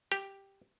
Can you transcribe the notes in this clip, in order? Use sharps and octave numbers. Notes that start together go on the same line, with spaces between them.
G4